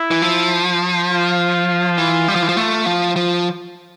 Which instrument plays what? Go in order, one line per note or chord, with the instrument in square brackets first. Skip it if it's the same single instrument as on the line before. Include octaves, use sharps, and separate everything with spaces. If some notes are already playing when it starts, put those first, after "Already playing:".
Already playing: [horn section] E4
[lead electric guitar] E3
F3
[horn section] F4
[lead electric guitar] E3
G3
F3
E3
F3
A3
F3
F3